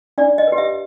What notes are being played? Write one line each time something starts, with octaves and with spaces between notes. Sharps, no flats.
D4 D5
D#5
G4 B4
E5